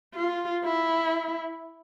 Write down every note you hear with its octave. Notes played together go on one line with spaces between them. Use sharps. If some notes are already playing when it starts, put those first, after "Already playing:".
F4
E4